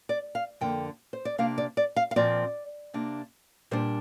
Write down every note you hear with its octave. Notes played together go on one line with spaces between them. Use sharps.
D5
F5
F2 D3 A#3 D4 G5
C5
D5
C3 A#3 D4 F5
D5
D5
F5
F5
A#2 F3 C4 D5
C3 A#3 D4
A#2 G3 D4 C5